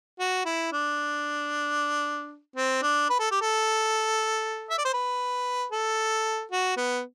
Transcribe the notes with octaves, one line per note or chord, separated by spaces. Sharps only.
F#4
E4
D4
C4
D4
B4
A4
G4
A4
E5
D5
C5
B4
A4
F#4
B3